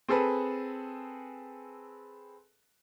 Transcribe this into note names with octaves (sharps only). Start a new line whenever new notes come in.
C4 G#4 A4 B4